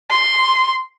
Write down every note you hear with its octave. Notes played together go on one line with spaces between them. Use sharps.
C6